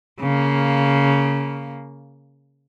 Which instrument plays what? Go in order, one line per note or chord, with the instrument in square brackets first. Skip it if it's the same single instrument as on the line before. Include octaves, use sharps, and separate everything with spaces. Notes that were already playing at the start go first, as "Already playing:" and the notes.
[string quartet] C#3 A#3